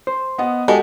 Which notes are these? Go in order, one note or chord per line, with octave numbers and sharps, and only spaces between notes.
C5
B3 D#5 F#5
G#3 F#4 G4 A4 D#5